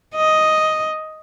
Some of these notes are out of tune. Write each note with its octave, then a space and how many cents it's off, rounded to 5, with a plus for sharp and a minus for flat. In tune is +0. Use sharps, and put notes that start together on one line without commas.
D#5 +5